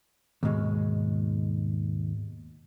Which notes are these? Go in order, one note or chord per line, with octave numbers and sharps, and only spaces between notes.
D#2 G#2 B2 G#3